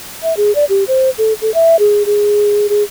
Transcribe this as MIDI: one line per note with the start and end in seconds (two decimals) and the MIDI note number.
0.23 0.36 76
0.37 0.54 68
0.55 0.65 74
0.69 0.84 67
0.88 1.10 72
1.18 1.33 69
1.41 1.53 69
1.54 1.76 76
1.79 2.03 68
2.06 2.67 68
2.69 2.83 68